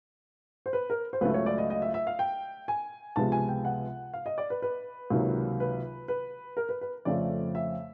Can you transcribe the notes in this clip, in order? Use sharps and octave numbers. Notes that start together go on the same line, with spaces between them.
C5
B4
A#4
C5
C#2 C#3 F#3 A3 B4
C#5
D5
D#5
D#5
E5
E5
F5
G5
G#5
C#2 C3 F3 G#3 B3 A5
G#5
G5
F#5
F5
D#5
D5
B4
B4
C#2 C3 D#3 F#3 A#3
B4
B4
A#4
B4
B4
F2 C#3 F3 A3 C4 D5
E5